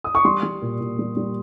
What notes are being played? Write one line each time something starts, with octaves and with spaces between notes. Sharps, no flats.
D#6
C#6
G3 C6
G3
A#2
A#2
G3
G3